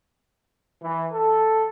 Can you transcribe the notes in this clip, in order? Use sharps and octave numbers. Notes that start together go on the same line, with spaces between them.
E3
A4